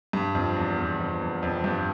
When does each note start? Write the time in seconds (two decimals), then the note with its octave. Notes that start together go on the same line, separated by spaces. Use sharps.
0.13 G2
0.35 F2
0.56 E2
0.78 E2
0.99 F2
1.21 E2
1.43 F2
1.64 G2